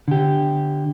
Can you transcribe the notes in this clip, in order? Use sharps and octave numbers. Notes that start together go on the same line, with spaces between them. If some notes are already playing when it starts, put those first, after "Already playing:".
D3 G4